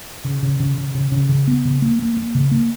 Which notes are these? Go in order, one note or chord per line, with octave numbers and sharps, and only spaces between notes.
C#3
C#3
C#3
C#3
C#3
C#3
C#3
B3
C#3
A#3
A#3
A#3
C#3
A#3